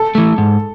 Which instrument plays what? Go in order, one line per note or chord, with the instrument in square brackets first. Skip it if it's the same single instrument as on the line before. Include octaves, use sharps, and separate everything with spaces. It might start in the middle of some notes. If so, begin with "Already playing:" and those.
Already playing: [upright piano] A4
[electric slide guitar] E3 A3
G#2